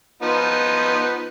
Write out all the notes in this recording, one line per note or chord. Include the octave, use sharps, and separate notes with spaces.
F3 B3 D#4